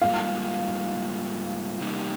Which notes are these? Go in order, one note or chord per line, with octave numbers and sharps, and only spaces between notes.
G#2 G3 A#3 F4 F5
C3 G3 A#3 D#4 G4